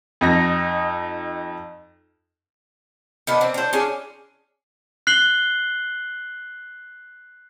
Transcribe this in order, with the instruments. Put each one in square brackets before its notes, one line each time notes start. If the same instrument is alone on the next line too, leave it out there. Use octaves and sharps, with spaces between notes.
[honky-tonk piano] F2 D#4 A#6
[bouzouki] D#3 B3 D4
C4
D4 C5
C#4 D4 G#4
[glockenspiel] F#6 C7 F#7 G7